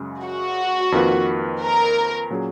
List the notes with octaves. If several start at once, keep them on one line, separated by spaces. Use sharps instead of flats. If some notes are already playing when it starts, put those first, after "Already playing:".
Already playing: F#2 C#3 G#3
F#4
F2 D#3 A#3 F4 B4
A#4
A#2 F#3 C#4 G#4